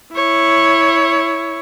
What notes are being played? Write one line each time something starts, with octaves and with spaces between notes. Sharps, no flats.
E4 C#5